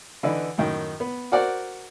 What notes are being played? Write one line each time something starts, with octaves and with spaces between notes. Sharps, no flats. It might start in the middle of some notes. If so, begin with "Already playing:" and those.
D3 E3 D#4 B4
F#2 A2 D#3
B3
F#4 A#4 C5 D5 F#5